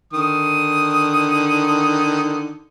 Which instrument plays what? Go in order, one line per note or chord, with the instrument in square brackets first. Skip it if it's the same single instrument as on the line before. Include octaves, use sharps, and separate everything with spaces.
[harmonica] D3 D#3 D#6